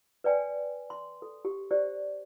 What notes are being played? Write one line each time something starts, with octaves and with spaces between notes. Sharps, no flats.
B4 D5 G5 G#5
C6
A4
G4
G4 C5 D5